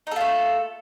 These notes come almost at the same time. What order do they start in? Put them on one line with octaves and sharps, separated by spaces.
D#4 A4 F4 A3